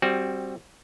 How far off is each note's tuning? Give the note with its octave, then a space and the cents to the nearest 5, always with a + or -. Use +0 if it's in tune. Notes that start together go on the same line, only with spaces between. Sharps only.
G3 +0 C4 +15 F#4 +0